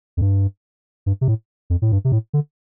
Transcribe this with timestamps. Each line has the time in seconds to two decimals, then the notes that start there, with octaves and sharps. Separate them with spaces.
0.17 F2
0.21 G2
1.06 G2
1.21 C3
1.28 A2
1.70 F2
1.82 A2
1.92 G2
2.05 C3
2.12 A2
2.33 D3